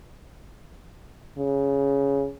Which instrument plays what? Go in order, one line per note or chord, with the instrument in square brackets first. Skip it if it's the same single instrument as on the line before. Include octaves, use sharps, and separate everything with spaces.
[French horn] C#3